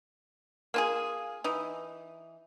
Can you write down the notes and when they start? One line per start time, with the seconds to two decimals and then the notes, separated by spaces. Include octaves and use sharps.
0.74 A#3 F4 G#4
1.44 E3 D#4